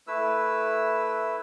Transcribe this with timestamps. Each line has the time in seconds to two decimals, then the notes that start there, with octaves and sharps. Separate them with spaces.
0.07 A3 E4 B4 E6